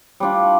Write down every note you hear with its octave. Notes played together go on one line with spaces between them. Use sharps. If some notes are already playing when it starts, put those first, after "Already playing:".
G3 D4 F4